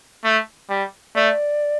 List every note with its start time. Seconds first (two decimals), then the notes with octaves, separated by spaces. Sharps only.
0.24 A3
0.70 G3
1.15 A3 D5